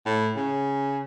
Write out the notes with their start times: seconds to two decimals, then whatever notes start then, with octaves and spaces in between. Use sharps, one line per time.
0.06 A2
0.36 C#3